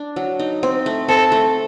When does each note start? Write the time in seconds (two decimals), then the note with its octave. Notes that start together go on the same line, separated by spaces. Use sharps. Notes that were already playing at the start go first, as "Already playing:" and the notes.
Already playing: D4
0.16 F#3
0.39 D#4
0.63 C4
0.86 A3
1.08 C4 A4
1.32 A3